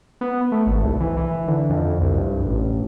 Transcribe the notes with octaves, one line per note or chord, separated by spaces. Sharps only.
B3
A3
G#1
C2
E3
E3
D3
F2
C2
G2
A1